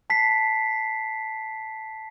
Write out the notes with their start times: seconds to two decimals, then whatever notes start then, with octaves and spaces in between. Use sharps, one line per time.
0.10 A5 B6 C7